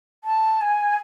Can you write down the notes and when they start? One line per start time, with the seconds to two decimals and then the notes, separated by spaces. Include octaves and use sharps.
0.24 A5
0.61 G#5